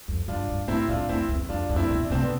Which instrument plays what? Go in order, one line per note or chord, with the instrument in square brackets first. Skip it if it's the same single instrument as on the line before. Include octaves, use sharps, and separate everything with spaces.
[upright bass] F2
[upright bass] G2 [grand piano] D4 F4
[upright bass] G2
[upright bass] A2 [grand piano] C4 E4
[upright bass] A2 [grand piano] D4 F4
[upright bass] F2 [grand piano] C4 E4
[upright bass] E2
[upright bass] F2 [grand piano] D4 F4
[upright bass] F2 [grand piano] D4
[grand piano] C4 E4
[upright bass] B2
[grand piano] D4
[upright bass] C3 [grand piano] C4
[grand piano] B3 D4